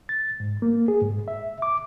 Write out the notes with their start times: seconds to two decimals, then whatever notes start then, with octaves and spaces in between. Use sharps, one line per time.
0.09 A6
0.40 G#2
0.62 A#3
0.88 G#4
1.01 G#2
1.28 E5
1.62 D6